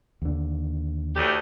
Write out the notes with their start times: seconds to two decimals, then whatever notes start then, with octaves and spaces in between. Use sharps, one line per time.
0.22 D#2 D3
1.15 D2 A2 G4